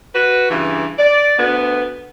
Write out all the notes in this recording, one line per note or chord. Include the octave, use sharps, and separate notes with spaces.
F#4 B4
G2 C#3 E3
D5
D2 B3